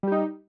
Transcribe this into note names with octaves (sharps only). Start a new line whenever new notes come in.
G3 D#4 G4